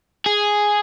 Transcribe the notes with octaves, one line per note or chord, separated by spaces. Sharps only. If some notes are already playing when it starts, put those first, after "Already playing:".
G#4